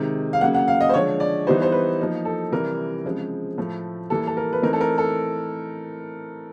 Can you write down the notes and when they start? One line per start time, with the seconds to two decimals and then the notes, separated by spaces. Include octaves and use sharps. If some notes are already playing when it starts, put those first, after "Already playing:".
Already playing: C3 D#3 G#3
0.33 F5
0.41 C#3 F#3 A#3 F#5
0.55 F#5
0.68 F5
0.81 D#5
0.89 C5
0.93 D3 F3 G#3 C#5
1.20 D5
1.47 E3 G3 B3 D#4 C5
1.62 C5
1.72 B4
1.99 F3 A#3 D#4
2.25 A4
2.52 C3 E3 G3 A#4
3.04 C#3 F3 G#3 C4
3.58 A2 F3 A3
4.10 E3 G3 A#3 A4
4.27 A4
4.37 A#4
4.53 B4
4.62 E3 A3 C4 D#4 A#4
4.73 A4
4.81 A#4
4.98 A4